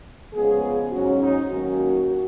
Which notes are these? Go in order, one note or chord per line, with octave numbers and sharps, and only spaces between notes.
C#3 F3 G#3 B3 G#4
G#2 F#3 C#4 F#4
D#4
D#2 D#3 F#3 C#4 F#4